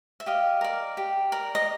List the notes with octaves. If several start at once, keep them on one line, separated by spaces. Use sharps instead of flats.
E5
G4 D#5 F5
A#4 D5
G4
A#4 D5
D#5